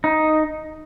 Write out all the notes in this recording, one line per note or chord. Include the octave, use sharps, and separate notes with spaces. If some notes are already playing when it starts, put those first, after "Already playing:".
D#4